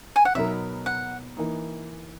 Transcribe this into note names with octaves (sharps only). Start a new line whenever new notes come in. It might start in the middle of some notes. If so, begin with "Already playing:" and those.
G#5
F#5
B2 F#3 B3 D#4 A#4 E5
F#5
E3 A#3 D#4